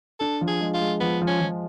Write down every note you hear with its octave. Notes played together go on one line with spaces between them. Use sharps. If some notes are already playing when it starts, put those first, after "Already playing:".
D4 A4
F3
G#4
G#3
F4
G#3
F3 B3
F3
C#4
F3